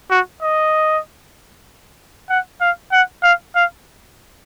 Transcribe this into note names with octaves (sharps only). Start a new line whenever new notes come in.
F#4
D#5
F#5
F5
F#5
F5
F5